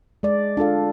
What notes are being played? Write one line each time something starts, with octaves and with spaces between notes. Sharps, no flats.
G#3 D5
D4 F4 A4 F5